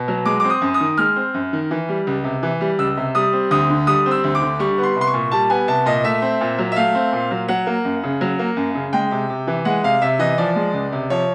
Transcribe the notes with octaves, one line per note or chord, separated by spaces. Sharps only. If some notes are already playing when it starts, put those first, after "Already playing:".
Already playing: B2
F#3
G#3 D6
C4 D6
D#6
F#2
D#6
D#3
G#3 F6
C4
F#2
D#3
E3
G3
C#2
C3
E3
G3
C#2 E6
C3
G3 D#6
C4
D2 D#6
D3
G3 D#6
C4
E6
D2
D6
D3
G3 C#6
B3
C6
C2
C6
C#6
A#2
G3 A5
B3 G#5
C2 A5
A#2 D#5
A3 E5
C4
A#2
F#3
E5
A3 F5
C4
A#2
F#3
F#3 F#5
A#3
F#2
C#3
F#3
A#3
F#2
C#3
G#3 G5
C3
C3
E3
G#3 F#5
C3 F5
C3 E5
E3 D#5
F3 D5
G#3
C#2
C3
F3 C#5